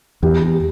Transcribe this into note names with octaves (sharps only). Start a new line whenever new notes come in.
E2 G4
G4